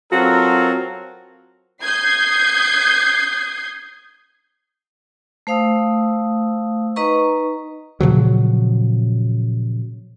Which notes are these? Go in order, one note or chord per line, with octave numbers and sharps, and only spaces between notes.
F#3 C4 F4 F#4 A4 A#4
D#6 G6 G#6 C7
A3 C5 F5 D#6 E6
D#4 B4 D#5 A#5 C#6
A#2 C#3 F3 F#3